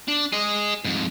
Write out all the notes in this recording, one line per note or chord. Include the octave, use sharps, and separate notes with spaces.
D4
G#4 D#5
F2 G#2